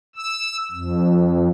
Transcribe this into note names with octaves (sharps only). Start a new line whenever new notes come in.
E6
F2